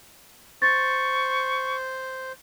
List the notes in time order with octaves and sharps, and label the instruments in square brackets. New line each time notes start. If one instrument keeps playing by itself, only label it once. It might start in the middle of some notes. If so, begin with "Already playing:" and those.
[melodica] C5 [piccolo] C#6 [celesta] A6